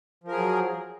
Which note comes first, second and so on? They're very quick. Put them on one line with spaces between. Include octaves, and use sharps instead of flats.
F3 A#4 G#4 F#3